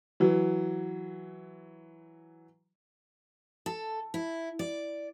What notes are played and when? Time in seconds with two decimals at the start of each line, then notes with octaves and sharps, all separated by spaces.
0.20 E3 F#3
3.66 A4
4.14 E4
4.59 D5